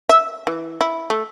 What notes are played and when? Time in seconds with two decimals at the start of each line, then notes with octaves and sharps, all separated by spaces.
0.09 E5
0.47 E3
0.81 E4
1.10 A3